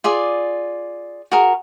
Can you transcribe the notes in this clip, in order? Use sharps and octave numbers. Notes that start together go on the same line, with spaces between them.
F4 G#4 D5
F#4 G#4 A#4